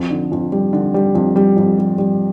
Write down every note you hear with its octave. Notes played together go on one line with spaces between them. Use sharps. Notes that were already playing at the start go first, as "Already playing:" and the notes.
Already playing: F2
D3
F2
G3
D3
G3
F2
G3
F2
G3
G3